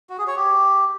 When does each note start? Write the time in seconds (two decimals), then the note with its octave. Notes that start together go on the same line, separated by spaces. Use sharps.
0.10 F#4
0.18 G#4
0.27 C#5
0.36 G4